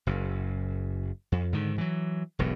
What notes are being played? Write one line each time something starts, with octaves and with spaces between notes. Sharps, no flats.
F#1 F#2
F2
G#2 D3 D#3
E3 F#3
E1 B1 G2